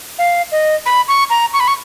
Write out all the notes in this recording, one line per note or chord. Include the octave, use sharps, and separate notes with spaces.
F5
D#5
B5
C#6
A#5
C#6
B5
C#6